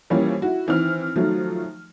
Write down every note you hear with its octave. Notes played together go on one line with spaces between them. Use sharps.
E3 F3 G3 A#3 C#4
E4 F#4
D#3 E3 C4 F6
D#3 F3 F#3 A3